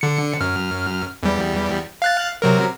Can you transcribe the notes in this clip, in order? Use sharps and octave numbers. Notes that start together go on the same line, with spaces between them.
D3 C#7
F#2 F6
E2 G3
F5 F#6 A6
C3 F#3 A#4